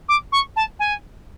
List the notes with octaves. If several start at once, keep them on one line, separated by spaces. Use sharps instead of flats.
D6
C#6
A5
G#5